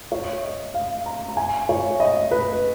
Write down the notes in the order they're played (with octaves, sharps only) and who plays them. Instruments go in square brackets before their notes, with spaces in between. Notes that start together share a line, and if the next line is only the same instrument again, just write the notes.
[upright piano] C#5
D#5
F5
A#5
A#5
G#5
C#5
D#5
B4